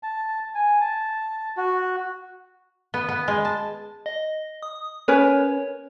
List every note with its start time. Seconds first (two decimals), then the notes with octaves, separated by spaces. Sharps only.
0.03 A5
0.55 G#5
0.81 A5
1.57 F#4
2.94 B3
3.09 B3
3.28 G#3
3.45 A5
4.06 D#5
4.62 D#6
5.08 C#4 A#4 B4 C#5